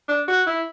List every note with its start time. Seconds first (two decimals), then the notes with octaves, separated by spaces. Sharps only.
0.09 D4
0.28 F#4
0.47 E4